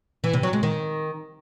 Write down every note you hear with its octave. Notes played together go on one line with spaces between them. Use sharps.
E3
C3
F#3
G#3
D#3